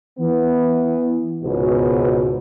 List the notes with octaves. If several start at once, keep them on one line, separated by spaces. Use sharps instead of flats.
E3 B3
C#2 G#2 B2